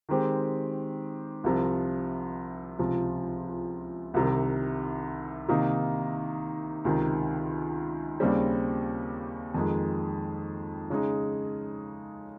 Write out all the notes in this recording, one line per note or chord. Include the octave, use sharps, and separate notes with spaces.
D#3 G#3 C4 G4
C2 C3 F3
C#2 C3 F3
C2 C3 D#3
C3 D#3 A#3 D#4
C#2 C3 D#3
D#2 C#3 G3 C4
F2 D#3 G#3
C#3 G#3 D#4